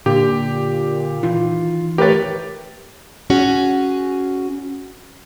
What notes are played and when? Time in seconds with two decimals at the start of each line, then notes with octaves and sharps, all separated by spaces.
0.06 A#2 D3 G4
1.23 D#3 E3 F4
1.98 A2 G4 A#4 B4 C#5 A6
3.30 C#4 F#4 G#4